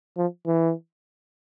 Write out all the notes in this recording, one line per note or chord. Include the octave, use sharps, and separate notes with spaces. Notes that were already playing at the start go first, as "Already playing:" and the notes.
F3
E3